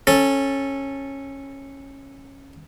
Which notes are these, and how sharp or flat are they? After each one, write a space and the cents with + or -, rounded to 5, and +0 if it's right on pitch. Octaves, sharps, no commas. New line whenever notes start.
C#4 -15 A4 +0